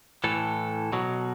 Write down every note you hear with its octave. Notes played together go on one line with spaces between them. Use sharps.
A2 E3 A4
B2 F#3